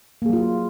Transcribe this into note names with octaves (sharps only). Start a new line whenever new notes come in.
F#3 A#3 F4 G#4